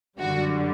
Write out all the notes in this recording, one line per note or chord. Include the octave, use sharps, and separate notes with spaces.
F#2 D3 G3 F#4